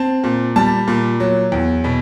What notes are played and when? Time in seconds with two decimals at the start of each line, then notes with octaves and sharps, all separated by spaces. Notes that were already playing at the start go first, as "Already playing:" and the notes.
Already playing: C4 A5
0.24 A#2
0.56 G3 A5
0.88 A#2
1.20 F#3
1.52 E2
1.84 B2